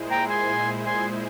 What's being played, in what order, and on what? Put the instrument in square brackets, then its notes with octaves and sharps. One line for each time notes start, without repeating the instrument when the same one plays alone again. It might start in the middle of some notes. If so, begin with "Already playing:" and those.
Already playing: [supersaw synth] A#2 G#3 E4 G#4 C5
[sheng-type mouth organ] G5 A#5
G#5 C6
G#5 C6